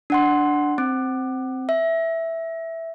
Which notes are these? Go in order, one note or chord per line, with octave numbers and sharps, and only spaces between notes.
D4 F#5 C6
C4
E5